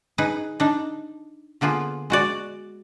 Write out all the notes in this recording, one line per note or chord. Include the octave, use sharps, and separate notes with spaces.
D#4 G#4 B4
D4 D#4
D3 A#3 B3 F4 G#4
G#3 F#4 D5